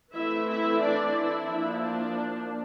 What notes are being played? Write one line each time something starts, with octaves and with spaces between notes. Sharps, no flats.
E3 A3 C4 E4 E5
E4 E5
D4 D5
E4
F3 A#3 D4
D4